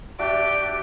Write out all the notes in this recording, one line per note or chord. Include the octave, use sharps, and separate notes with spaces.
D4 F#4 G4 D5 E5 D7